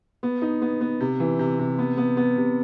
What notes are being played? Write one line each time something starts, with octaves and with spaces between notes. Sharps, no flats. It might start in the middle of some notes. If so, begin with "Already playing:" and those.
B3
D#4
B3
B3
C3
E3
C3
C3
B3
B3
B3
C3